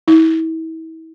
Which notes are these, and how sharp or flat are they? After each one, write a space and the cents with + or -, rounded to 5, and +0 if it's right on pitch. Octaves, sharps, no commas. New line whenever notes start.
E4 -35